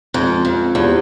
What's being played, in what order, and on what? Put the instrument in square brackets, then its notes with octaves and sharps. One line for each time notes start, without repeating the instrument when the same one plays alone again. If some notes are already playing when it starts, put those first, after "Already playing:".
[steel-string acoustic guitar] F2 [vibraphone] G#3 C#4 F4
[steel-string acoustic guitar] F2
[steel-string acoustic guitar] E2 [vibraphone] E4 G4 C5 F5